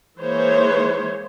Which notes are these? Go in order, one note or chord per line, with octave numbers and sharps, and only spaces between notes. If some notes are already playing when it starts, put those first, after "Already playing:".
E3 G#3 A#3 C5 C#5